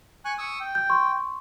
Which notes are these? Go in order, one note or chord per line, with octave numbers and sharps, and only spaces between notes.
G#5 C#6 F#6
C#6 D#6 E6
G5
G6
C6 C#6